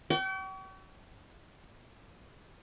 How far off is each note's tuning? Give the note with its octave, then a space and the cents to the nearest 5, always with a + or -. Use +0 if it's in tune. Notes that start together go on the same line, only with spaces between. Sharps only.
G5 -40 C#6 +40